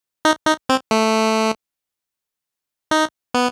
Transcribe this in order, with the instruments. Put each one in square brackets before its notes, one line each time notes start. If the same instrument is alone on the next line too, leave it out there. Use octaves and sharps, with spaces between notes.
[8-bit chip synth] D#4
D#4
C4
A3
D#4
B3